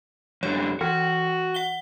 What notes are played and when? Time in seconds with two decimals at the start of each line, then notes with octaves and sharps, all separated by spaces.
0.43 F#2 D3 C#5
0.81 E3 F#4
1.54 F#5 G7